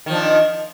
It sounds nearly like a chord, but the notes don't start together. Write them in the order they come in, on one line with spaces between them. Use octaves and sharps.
D#3 F3 D4